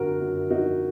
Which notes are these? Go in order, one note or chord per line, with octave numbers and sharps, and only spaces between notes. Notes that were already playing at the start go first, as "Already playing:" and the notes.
Already playing: F#2 D3 F3 F#4 A#4
F#2
F3 D#4 F#4